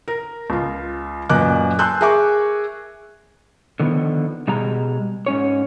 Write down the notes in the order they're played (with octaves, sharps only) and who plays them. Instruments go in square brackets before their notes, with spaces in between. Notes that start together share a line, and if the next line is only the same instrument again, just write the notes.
[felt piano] A#4
C#2 F4
F#2 A#2 B4 D#5 D6 F#6
G#5 A5 C6 E6 F#6 G6
G#4 A#4 E5 G#5 C#6 D6
[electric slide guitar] D3 D#3 F3 A#3 B3
B2 G3 G#3 A#5
G#2 C#4 C#5